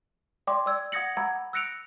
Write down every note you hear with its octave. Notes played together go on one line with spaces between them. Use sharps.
D5 G5 C6 D6
D5 E6 G#6
F#5 D#6 G#6 A#6 C#7 F#7
F#5 A#5 B5 D6 E6 G#6
E6 F#6 A#6 C#7 D7 F7